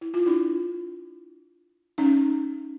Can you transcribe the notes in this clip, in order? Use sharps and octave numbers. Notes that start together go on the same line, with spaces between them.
E4
F4
D4 E4
C#4 D#4